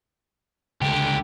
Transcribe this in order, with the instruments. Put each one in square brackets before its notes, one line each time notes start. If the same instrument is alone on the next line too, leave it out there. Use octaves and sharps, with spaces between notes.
[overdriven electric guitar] C#2 D3 [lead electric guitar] G4